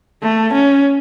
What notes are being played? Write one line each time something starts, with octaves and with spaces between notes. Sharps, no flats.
A3
C#4